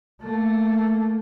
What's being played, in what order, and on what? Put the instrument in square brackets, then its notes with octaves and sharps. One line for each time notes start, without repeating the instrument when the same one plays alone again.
[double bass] A3 A#3